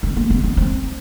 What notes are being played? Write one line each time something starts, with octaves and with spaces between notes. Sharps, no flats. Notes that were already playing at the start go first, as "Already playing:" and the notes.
C4
A#3
B3
C4
C4